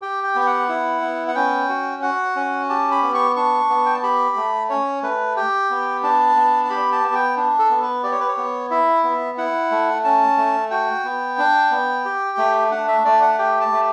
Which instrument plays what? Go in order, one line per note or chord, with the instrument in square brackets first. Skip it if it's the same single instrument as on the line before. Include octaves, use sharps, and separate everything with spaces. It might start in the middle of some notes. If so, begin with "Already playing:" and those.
[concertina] G4 G5
G5
B3 G5
F#5
E4
B3
F#5
C#4 G5
F#4
F#4 F#5
C#4
G4 A5
B5
B3
C#6
D4 C#6
B3
G5
A5
G4 B5
A3
C#4 C#5
A3 B4
G4 G5
B3
D4 A5
B3
A5
G4 B5
A5
B3 A5
G5
D4
A4
B3
B4
G4 D5
C#5
B4
C#5
B3
E4 E5
B3
E4 F#5
A3
C#4 A5
A3
F#4 G5
B3
D4
B3
G4
A3
D4 F#5
E5
A3 D5
F#5
G4 G5
A5
A3